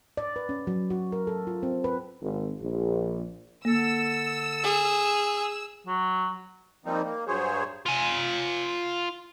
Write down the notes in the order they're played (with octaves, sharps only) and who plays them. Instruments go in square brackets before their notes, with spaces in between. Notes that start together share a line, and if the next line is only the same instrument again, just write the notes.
[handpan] D5
B4
C#4
F#3
F#4
A#4
A4
F4
C4
B4
[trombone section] G#1
A#1
[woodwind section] D3 A4 [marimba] A#3 [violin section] E6
[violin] G#4
[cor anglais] F#3
[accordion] F3 G3 A#3 C4 D#4
A#3
G2 F#3 G#4 C5 C#5
[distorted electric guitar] F4 G#5